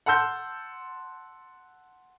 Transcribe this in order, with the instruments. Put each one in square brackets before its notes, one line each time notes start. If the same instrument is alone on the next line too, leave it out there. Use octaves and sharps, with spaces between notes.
[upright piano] F#5 A5 C6 E6 G6